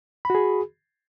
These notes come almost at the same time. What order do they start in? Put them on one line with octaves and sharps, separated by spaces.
B5 F#4 G#4